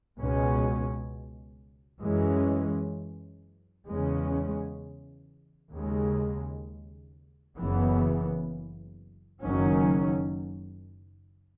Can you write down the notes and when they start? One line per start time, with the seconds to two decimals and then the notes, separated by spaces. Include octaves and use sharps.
0.18 C#2 B2 G#3 C#4
2.02 F#2 E3 G#3 C#4
3.87 E2 C#3 G#3 C#4
5.73 D#2 C#3 G#3
7.58 F#1 F#2 C#3 E3 B3
9.42 F#1 F#2 D#3 F#3 C#4